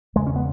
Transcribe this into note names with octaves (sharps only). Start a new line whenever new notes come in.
E2 C#3 G#3
C#4
B3